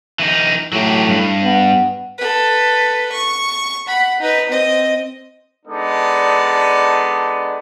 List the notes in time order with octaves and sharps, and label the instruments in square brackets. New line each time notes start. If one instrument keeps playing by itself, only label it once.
[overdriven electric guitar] E3 D#4
[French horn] A2 [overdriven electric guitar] F#3 G4
[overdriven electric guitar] G2
[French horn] B3
[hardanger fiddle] A4 B4
C#6
F#5 B5
D#4 B4
C4 D#5
[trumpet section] G#3 B3 D4 D#4 A4 D5